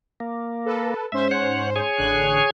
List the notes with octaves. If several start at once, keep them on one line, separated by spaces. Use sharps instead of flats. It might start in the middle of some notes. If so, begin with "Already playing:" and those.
A#3
A4 B4
G#2 C#4 C5 E5
C#5 F#5
G#4 C#5 G#5
A1 D3 F#6